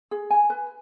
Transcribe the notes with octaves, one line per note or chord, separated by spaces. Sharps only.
G#4
G#5
B4